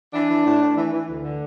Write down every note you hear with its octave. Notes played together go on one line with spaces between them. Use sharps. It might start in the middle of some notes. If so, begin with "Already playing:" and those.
E3 D4
E3
A2
A2
E3
E3
D2
D3